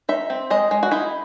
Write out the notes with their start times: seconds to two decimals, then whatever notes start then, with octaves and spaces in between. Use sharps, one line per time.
0.09 D#4 E5
0.30 C4
0.50 G#3 D#5
0.71 G#3
0.83 F#4
0.91 D#4 E4